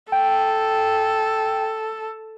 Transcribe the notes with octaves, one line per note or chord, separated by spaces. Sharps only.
A4 G5